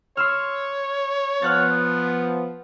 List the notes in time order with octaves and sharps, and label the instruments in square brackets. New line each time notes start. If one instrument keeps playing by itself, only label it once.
[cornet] C#5 [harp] C6 E6 F6
[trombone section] F3 B3 [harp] F6 F#6 A6